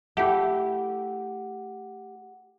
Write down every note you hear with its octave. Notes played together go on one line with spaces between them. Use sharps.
A3 E4 G4 F#5